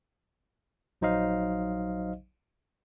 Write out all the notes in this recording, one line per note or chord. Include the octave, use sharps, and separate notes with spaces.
A#1 F#3 D#4 C5 D#5 F5